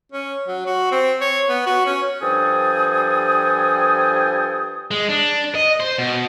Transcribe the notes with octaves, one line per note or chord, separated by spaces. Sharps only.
C#4
F#3
F#4
C4
C#5
B3
F#4
C#4
G2 F3 A4 G5 G#5 D#6
G#3
D4
D#5
C5
B2